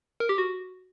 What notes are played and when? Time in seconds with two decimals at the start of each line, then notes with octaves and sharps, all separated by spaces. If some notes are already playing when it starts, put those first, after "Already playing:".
0.20 A#4
0.29 G4
0.38 F#4